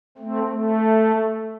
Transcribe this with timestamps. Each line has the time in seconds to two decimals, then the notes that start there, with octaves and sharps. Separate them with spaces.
0.18 A3 C4
0.48 A3